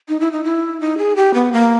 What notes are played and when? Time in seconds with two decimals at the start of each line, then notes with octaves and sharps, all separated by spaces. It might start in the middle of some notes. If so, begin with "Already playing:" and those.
0.09 D#4
0.20 E4
0.32 D#4
0.44 E4
0.80 D#4
0.98 G#4
1.16 G4
1.34 B3
1.52 A#3